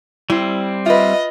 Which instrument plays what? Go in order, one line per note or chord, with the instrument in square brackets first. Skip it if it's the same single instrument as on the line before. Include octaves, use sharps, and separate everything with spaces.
[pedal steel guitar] G3 C4 [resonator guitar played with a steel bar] E4
[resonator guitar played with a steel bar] F4 B4 [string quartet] D#5 [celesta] E5